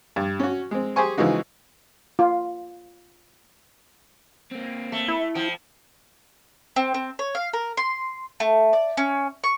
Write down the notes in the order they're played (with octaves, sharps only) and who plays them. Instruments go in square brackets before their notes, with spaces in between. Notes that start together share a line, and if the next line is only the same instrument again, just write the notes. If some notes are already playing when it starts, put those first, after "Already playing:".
[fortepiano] G2
C#4 F#4
G#3 C4
G4 G#4 C5 G#5 C#6
C#3 E3 F3 G#3 D#4 F#4
[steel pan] F4
[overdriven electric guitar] A#3 C4
[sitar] A3
[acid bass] E4
[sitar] F3 [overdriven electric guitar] G5 A5
[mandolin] C4
C4
C#5
F5
A#4
C6
A3
D5
C#4
C#6